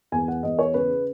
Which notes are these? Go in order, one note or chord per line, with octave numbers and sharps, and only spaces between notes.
E2 G#5
F#5
E2 D#5
C#5
C#3 B4